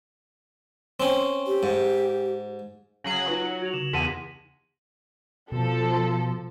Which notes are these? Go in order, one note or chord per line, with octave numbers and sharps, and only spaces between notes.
C4 C#4
G4
G#2
C#3 F#3 G#4 A#6 F#7
F#3 D#4 F4 B4
C#7
F#4 G#6 F7
C#3 E7
E2 F#5 A5 C6 B6 D#7
B2 F3 A4